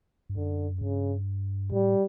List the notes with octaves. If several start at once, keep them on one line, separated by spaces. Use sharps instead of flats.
G2
F#2 D3
G2 C#3
A2 G3